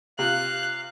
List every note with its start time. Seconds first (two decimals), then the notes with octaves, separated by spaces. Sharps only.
0.19 C3 F4 F5 F#6